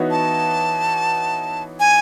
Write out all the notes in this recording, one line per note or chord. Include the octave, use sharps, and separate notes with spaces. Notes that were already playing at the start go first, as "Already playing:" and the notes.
Already playing: E3 B3 D#4 F#4 C#5
A5
G#5